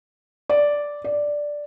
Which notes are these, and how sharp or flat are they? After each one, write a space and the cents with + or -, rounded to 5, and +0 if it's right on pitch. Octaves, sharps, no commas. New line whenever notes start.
D5 -5
D5 +0